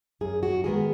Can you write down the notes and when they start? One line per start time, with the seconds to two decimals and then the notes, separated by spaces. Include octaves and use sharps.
0.21 F#2 G#4
0.43 F#4
0.64 D#3 G#3 B3 G#4